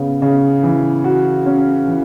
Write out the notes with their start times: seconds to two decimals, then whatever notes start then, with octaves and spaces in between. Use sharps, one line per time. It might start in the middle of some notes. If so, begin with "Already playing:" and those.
Already playing: C#3 B3
0.22 C#3
0.63 E3
1.04 F#4
1.46 C#4
1.87 E3